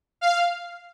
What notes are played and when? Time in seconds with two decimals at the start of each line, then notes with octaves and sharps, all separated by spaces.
0.21 F5